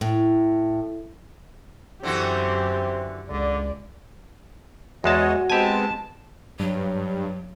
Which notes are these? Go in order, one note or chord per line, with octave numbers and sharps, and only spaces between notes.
A2
F#2 D3 E3 C4 F#4 G4
C#2 D3 D5
E2 G#3 F#4 C#5 D#5 A5
G#3 B3 C4 G4 G#5 A5
G2 F#3